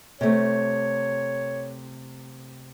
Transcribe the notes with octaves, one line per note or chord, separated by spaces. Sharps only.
C3 A3 C#5